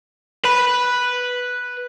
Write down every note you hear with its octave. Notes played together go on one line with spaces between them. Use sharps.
B4 B5